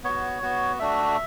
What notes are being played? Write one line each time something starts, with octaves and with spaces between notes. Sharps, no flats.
B3 F#4 C#5
B3 F#4
A3 D4 F#4 E5